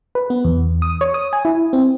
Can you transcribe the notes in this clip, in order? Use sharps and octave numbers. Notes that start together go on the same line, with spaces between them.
B4
B3
E2
D#6
C#5
D#6
G#5
E4
C4